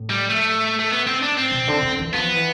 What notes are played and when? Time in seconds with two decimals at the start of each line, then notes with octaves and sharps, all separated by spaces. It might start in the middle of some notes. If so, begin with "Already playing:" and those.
Already playing: A2
0.10 G3
0.30 A3
0.79 A3
0.91 B3
1.07 C4
1.22 D4
1.37 C4
1.52 B2
1.68 D3
1.82 D3
1.99 E3
2.13 F3 B3
2.34 E3